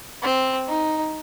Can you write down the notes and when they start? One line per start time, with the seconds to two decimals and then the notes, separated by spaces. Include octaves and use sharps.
0.23 C4
0.68 D#4